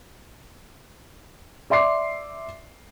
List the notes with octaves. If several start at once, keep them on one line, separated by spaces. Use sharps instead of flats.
D5 E5 C6 D6 C7